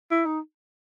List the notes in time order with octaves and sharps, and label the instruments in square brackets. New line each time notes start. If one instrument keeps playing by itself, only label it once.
[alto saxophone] E4
D#4